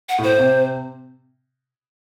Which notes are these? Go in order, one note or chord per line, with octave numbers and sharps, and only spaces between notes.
F#5
A2
C5
C3